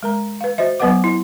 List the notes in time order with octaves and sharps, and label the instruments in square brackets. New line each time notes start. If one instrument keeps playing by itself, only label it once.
[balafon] G#3 A#4 A#5
B4 F5
F#4 C5 D#5 E5
F#3 B3 B4 D#5 F#5 D6
E4